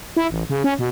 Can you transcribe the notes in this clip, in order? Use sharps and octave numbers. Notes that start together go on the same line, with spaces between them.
E4
A1
C#3
C#4
B2